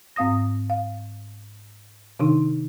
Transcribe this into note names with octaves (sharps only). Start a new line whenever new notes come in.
G#2 C4 F5 D#6 A#6
F5
C3 D#3 D4 D#4